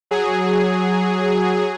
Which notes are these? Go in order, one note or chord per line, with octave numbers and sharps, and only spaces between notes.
F#3 G#4